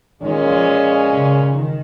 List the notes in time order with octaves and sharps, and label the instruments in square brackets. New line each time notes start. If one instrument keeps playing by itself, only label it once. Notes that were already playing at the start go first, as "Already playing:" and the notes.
[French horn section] A#2 G#3 C#4 [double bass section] D#3
[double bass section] F3
C#3
D#3